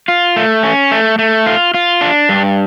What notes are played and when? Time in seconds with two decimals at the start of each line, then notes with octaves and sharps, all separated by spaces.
0.08 F4
0.36 A3
0.63 C#4
0.91 A3
1.19 A3
1.46 F4
1.74 F4
2.01 D4
2.29 G2